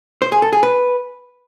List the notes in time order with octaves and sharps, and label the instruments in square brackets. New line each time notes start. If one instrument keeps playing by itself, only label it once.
[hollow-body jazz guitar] C5
G#4
A4
G#4
B4